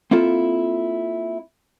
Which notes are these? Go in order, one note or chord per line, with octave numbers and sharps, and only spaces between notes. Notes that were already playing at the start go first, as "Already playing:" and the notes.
A#3 C4 E4 F4 A4